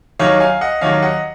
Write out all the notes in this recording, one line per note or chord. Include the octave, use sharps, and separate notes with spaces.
D#2 D#3 F#3 C#5 F5
F5 G#5
D#5 F#5
D#2 D#3 F#3 C#5 F5
D#5 F#5